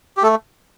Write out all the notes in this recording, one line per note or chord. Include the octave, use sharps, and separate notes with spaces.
G4
A3 A4